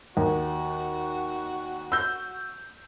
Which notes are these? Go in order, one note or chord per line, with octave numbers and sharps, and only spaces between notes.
D#2 F#4
E6 G6